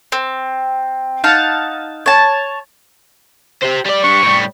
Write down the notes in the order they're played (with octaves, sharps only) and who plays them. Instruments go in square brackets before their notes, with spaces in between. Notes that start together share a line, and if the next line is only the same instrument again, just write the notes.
[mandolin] C4
D#4 F5 F#5 A5
C#5 A5
[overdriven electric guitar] G4 C5
G3 D5
[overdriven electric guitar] G3 D4 [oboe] C#6
[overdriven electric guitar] A2 G3